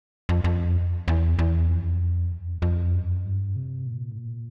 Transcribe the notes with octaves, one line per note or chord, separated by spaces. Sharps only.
F2
F2
E2
E2
F2
E2
F2
F2
F#2
G2
C3
A#2
A2
A#2